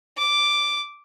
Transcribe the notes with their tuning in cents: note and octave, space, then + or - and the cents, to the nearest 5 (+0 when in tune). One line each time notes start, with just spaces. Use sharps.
D6 +0